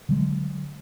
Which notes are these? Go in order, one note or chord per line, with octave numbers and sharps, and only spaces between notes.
D3 F#3 G#3